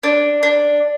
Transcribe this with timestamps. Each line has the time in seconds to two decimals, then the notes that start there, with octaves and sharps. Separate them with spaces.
0.03 D4
0.43 D4